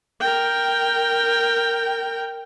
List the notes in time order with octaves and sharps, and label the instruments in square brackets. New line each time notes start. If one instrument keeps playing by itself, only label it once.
[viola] A#4 G5